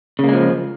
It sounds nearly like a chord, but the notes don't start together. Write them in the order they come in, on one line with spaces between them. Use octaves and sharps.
C#3 A#3 G#3 F3